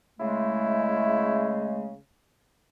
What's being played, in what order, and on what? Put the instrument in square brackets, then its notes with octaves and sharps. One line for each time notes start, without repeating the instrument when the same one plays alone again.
[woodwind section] C#3 G#3 A3 [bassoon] E4